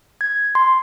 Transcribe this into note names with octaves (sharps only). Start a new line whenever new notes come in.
G#6
C6